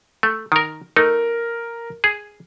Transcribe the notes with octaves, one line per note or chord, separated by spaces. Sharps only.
A3
D#3 A#4
A3 D#4 A#4
G#4